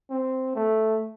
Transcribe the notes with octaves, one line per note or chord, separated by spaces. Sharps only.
C4
A3